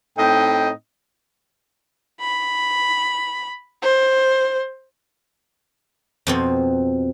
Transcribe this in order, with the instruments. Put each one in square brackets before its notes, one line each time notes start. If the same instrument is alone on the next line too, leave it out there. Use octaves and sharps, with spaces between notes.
[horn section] A2 C4 D#4 D#5 G5
[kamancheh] B5
C5
[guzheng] F2 B2 C4